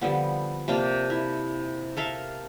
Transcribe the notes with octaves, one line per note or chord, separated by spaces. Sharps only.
D3 F3 G3 B3
C3 A#3 D4 F4
E4
A4 A#4 E5 F5